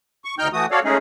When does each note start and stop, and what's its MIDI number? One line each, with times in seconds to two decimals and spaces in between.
0.24 0.35 85
0.39 0.48 38
0.39 0.48 63
0.39 0.48 79
0.39 0.48 89
0.39 0.48 91
0.53 0.66 52
0.53 0.66 57
0.53 0.66 66
0.53 0.66 87
0.71 0.80 66
0.71 0.80 69
0.71 0.80 73
0.71 0.80 74
0.71 0.80 77
0.84 0.98 56
0.84 0.98 57
0.84 0.98 61
0.84 0.98 63
0.84 0.98 68